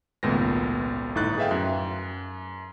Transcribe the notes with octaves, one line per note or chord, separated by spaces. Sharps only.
G#1 C#2 A#2 A3 B3 A#6
G1 A2 D#4 F#6 A6
G#4 B4 E5 F5 G5
F#2